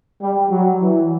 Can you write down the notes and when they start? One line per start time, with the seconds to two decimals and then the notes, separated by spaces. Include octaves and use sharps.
0.20 G3
0.51 F#3
0.80 E3